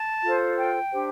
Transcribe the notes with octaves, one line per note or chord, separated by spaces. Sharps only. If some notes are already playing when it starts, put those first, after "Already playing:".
Already playing: A5
F4 A4 C5
G5
D4 G4 C5